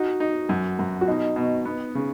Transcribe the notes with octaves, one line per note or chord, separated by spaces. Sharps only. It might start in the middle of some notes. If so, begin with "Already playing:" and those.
Already playing: D#4 F#4
D#4
F#2
F#2
F#4
B2 D#4
B2
B3
C#3